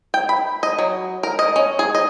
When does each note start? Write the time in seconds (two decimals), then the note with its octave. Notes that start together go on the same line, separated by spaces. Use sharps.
0.14 G5
0.29 B5
0.63 D#5
0.79 F#3
1.23 A#4
1.39 D#5
1.56 C#4
1.79 G#4
1.95 D#5